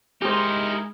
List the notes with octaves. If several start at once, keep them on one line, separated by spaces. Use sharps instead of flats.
G#3 D#4 E4 G4 G#4 A#4 C5